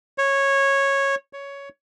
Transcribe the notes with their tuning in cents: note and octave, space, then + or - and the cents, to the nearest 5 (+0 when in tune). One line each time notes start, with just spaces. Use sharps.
C#5 -10
C#5 +10